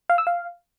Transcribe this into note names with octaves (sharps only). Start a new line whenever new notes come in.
F5
E6
F5